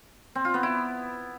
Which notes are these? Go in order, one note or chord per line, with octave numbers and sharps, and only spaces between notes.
C4
F4
B3
E4